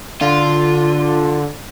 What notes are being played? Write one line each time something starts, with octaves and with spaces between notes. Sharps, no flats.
D3 F4